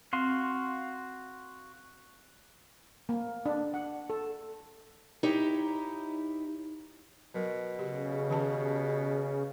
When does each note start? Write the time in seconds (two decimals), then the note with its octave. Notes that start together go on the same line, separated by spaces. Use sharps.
0.13 C4 F#4 F5 C6
3.09 A#3
3.46 D4
3.74 F#5
4.10 A4
5.23 D#4 E4 G4 C#5
7.35 B2 F#3 A#4
7.79 C#3 G4
8.29 D#3 G4 A5